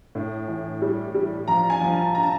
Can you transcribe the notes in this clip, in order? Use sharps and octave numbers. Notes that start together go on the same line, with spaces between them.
A2
E3
G3
G3
F3 A#5
G#5
F3
A5
A#5
A5